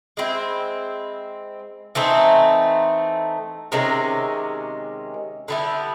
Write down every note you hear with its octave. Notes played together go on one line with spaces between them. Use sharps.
G#3 C4 E4
E3 A3 C4 D#4
C3 D#3 G#3 C#4
D3 G3 B3 E4